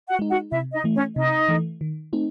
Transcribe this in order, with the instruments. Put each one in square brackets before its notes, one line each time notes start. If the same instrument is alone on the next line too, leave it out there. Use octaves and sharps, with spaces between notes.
[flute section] F#4 F#5
[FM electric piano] G#3 D#4
[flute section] F#4 F#5
[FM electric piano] C3 [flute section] E4 E5
[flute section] D#4 D#5
[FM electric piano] E3 A3
[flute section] C#4 C#5
[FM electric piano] C3 [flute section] D#4 D#5
[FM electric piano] E3 A3
D#3
A3 C4 D#4